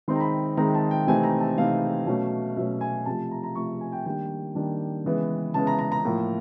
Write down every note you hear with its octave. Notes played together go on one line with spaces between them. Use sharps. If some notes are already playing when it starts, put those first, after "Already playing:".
D#3 G#3 C4 D#4 C6
A#5
B5
D#3 G#3 C4 D#4 A#5
A5
G5
C3 E3 A3 C4 D#4 G#5
A#5
A5
C3 E3 A3 C4 D#4 F5
B2 F#3 A3 C#4
B2 F#3 A3 C#4 E5
G#5
C3 F3 A3 A5
A#5
A#5
C3 F3 A3 C#6
G#5
G5
D#3 G3 A#3 D4 G5
D#3 G3 A#3 D4
C#3 E3 G#3 B3
C#3 E3 G#3 B3 A5
A#5
A#5
A#5
A2 F3 A#3